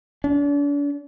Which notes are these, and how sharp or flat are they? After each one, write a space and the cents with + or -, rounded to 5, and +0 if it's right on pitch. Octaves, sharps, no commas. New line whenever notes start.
D4 -40